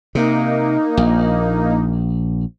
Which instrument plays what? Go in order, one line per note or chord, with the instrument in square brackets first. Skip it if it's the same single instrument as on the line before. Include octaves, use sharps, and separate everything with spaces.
[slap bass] C3 [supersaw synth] A#3 D#4
[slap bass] A#1